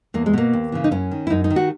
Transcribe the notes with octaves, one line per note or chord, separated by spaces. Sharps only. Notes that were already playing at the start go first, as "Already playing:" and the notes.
E2 A#3
G#3
B2 A#3
D#2
C#3 E3
D#4
F#2 C#4
D#3
E4
F#2 D#4
D#4
D#3
F#4